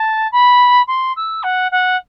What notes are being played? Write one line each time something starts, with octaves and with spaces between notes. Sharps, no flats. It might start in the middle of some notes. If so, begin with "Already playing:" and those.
Already playing: A5
B5
C6
E6
F#5
F#5